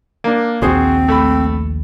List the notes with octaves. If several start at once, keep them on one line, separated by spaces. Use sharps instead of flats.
A#3 D4
A#1 D#2 C4 F#4 G#4 C5
A3 B5